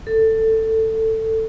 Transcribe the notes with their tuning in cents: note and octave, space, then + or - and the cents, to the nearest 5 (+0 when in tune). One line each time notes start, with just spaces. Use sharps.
A4 +15